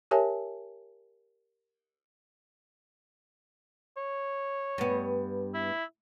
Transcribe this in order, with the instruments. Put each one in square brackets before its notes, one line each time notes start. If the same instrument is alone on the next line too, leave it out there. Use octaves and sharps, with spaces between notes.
[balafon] G4 A#4 C#5 E5 G#5 A5
[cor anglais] C#5
[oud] G2 B3
[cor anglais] E4